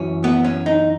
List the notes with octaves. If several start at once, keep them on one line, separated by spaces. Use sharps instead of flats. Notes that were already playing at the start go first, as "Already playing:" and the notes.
Already playing: F#2 E3 C#4
B3
C#4
D#4